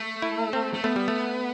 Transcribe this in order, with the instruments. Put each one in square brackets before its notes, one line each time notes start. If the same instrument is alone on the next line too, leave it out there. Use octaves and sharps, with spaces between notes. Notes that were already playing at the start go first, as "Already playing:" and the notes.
Already playing: [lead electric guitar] A3
[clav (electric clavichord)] E4
C4
[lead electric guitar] A3
[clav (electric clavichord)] A3 [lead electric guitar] B3
[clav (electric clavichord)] G3
A3